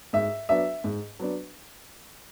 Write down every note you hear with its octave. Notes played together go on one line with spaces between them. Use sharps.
G#2 E5
F#3 B3 D4 E5
G#2
F#3 B3 D4